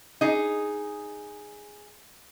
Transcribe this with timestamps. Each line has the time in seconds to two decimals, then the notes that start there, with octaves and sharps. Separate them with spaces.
0.21 D#4 G#4